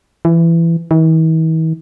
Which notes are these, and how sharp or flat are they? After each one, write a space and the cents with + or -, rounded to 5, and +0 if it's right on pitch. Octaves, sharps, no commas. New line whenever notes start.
E3 +20
E3 -45